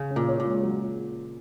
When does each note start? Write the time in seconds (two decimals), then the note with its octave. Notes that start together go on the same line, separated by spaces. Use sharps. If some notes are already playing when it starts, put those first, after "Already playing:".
Already playing: C#3
0.11 C#4
0.16 A#2
0.28 C#5
0.40 A#2
0.46 G#3
0.63 F#3